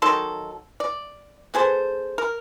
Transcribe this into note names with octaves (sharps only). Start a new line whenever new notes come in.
D#3 F#3 A4 C6
D5
B3 G#4 A4 C5
A#4